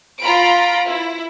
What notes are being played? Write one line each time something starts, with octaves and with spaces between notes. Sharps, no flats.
F4 A#5 B5 D7
E4